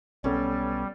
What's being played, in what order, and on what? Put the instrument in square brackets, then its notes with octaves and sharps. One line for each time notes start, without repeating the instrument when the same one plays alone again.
[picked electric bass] B1 B3 [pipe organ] G3 [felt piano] C#4 A4